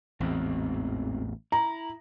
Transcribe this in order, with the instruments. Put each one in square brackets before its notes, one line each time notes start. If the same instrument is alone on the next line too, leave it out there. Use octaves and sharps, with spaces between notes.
[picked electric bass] A1 E2 [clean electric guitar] G#2 C4
[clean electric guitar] E4 [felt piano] A#5